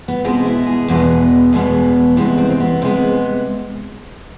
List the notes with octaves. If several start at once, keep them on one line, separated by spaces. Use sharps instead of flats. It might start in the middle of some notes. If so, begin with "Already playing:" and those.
B3
B2 G#3 B3 C4
E4
G#4
E2 B2 G#3 B3
E2 B2 G#3 B3
E2 C3 G#3 B3 E4
C4
C4
B3
C3 G#3 B3 C4